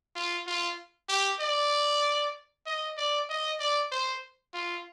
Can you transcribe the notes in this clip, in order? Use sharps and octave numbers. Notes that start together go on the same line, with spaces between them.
F4
F4
G4
D5
D#5
D5
D#5
D5
C5
F4